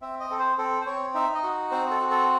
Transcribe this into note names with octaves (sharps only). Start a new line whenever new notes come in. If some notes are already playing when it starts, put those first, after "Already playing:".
C4 E5
D#5
C4 A4
C5
C4 A4
C5
C4 C#5
D#4 E5
D#5
F#4
C4 C5
A4
F#4
A4